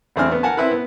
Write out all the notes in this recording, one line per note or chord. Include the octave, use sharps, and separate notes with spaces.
A1 E2 C4 D4 G#5 F6
B3
A#4 F#5 G#5 A5
C4 E4 B4
B3